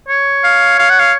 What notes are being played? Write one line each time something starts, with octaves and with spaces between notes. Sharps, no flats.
C#5
F5
F5
F#5
F5